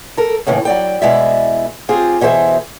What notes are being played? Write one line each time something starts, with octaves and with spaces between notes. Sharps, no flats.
A4 A#4
D#2 A2 C#3 E3
F#3 D5 G5
B2 G#3 E4 D5 E5
C4 F4 G4 G#4
D2 B2 E3 G#4 C5 E5